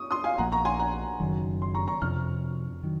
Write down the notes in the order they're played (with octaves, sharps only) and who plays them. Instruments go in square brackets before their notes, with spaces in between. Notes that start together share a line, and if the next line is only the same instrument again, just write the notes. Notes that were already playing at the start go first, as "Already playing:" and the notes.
Already playing: [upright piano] C#6 D#6
C6 D#6
F5 G#5
[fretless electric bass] A#1 A#2 F3 A#3 [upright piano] F#5 A#5
[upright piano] A#5 C#6
G#5 C6
F#5 A#5
[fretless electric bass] F#1 F#2 D#3 F#3
[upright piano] C6
A#5 C#6
A#5 C#6
[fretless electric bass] F2 C3 F3 [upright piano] C#6 F6
[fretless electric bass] D#3 F#3